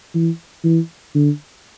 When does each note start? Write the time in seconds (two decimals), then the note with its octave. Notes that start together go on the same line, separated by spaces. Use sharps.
0.14 E3
0.64 E3
1.14 D3